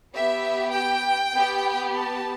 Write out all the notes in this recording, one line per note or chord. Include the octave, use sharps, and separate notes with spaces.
B3 G4 E5
G5
B3 G4
A5